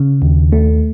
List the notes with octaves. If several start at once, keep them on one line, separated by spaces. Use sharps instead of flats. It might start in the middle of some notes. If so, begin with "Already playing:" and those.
Already playing: C#3
D#2
A3